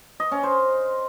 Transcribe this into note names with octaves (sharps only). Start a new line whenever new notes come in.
D#5
C#4
C5